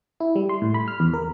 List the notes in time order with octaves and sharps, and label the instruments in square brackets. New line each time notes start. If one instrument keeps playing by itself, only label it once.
[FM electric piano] E4
G3
C6
A2
B5
F6
E2
A#4